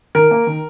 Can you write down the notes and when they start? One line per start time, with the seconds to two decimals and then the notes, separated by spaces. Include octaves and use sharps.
0.15 D#3 A#4
0.31 A#3
0.47 D#3